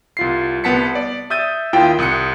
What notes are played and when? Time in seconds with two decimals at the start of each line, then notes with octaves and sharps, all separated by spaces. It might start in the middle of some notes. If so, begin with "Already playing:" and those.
0.17 C2 F4 C7
0.64 C2 B3 F#5 A5 B6 C#7
0.95 D5
1.30 E5 D#6 E6 G6 A6 D#7
1.73 D#2 E4 F4 G5
1.99 C2 D#6 F#6 C#7